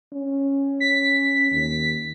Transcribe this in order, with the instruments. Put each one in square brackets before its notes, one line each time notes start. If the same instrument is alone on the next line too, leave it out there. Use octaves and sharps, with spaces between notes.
[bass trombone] C#4
[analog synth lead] B6
[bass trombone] D#2